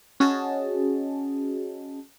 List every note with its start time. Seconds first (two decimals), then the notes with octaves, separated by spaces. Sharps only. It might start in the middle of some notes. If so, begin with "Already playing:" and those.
0.20 C#4 F#4 G#4 D#5 A5